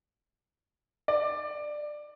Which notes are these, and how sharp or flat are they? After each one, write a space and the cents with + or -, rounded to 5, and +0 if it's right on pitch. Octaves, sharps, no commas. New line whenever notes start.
D5 +15